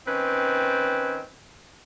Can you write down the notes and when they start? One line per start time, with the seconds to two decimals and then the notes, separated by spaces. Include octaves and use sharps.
0.06 D#3 C4 C#4 B4